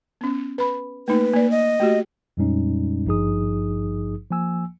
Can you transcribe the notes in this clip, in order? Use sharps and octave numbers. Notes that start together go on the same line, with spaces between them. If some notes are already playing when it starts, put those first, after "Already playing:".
B3 C#4
B4 B5
A3 A#3 D#4 B4
A#3 D5
D#5
A3 F#4 G4
F2 A#2 G3 G#3 C#4 D#4
G#1 G2 F3 D#4 G#4 D#6
F3 A#3 G#5 E6